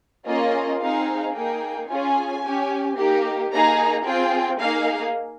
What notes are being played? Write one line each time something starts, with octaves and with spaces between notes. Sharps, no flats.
A#3 C#4 F4 G#4 D#5
C4 D#4 G#4 F5
A#3 D#4 G#4 G5
C#4 F4 G#4 G#5
C#4 G4
A#3 D#4 G4
A#3 D#4 G#4 A#5
C4 F4 G#4 G5
A#3 D#4 G#4 F5